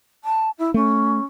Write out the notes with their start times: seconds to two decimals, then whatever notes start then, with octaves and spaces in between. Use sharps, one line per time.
0.24 A5
0.58 E4
0.74 A3 C#4